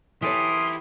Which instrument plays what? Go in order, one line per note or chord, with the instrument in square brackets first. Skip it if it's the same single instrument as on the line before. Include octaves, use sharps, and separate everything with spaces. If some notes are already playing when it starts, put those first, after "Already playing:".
[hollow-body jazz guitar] E3 A4 C#5 [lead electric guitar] E4 G4 [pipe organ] C6 F6 [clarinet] D#6